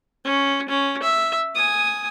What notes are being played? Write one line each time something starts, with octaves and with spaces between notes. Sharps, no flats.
C#4
C#4
E5
G#5 D#6